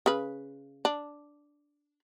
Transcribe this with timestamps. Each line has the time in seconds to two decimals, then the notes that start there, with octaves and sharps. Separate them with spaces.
0.06 C#3 B4
0.85 D4